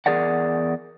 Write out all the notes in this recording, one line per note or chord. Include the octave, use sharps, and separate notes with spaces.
E2 G#4 A#4 D5 F#5